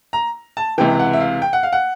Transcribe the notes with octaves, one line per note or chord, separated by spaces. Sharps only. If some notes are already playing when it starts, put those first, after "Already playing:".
A#5
A5
C#2 C3 E3 G5
F#5
E5
F5
G5
F#5
F5
F#5